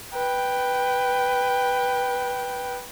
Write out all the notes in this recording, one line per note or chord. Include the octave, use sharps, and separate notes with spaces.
B4 G5